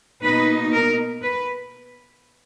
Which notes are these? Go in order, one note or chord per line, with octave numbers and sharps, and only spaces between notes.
B2 A#3 D#4 B4
A#4
B4